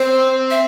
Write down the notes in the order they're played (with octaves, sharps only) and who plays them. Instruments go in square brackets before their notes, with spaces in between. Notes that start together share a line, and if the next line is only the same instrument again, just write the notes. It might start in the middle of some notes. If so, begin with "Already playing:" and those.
Already playing: [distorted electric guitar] C4 [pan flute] C5
[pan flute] E5